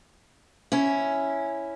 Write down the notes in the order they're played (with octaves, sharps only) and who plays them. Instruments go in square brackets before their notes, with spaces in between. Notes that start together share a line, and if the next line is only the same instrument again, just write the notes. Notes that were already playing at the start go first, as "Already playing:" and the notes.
[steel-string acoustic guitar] C#4 E4